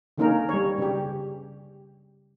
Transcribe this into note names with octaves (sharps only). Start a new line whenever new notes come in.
D3 D#3 A#3 C#4 D#4 A#4
G3 C#5
C#3 G4